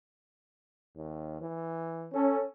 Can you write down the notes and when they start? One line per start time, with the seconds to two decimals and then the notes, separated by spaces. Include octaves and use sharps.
0.96 D#2
1.41 E3
2.14 C#4 A4